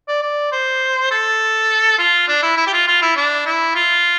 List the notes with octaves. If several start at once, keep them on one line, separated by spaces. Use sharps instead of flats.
D5
D5
C5
A4
F4
D4
E4
E4
G4
F4
F4
E4
D4
E4
F4